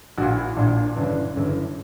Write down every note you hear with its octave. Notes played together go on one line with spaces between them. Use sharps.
A#1 A#2 F#4
E4
A#1 A#2 D4
D4
G1 F#2 C#3 E3 D4
G1 F#2 C#3 E3